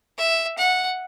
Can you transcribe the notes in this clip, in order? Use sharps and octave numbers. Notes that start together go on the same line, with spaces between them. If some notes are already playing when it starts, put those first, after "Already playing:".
E5
F#5